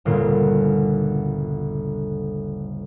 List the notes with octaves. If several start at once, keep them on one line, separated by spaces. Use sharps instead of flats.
G1 D2 A#2 C#3 C7